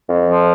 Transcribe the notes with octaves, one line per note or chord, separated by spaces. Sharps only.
F2
F3